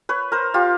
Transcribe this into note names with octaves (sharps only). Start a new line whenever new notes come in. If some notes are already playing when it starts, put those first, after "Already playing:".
B4 C#5
A#4 C5
F4 G4